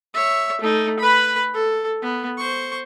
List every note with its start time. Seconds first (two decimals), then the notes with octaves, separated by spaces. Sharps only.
0.14 C#5 E5
0.61 A3 D#4
0.99 B4 B5
1.54 A4
2.02 B3
2.38 C5 C#6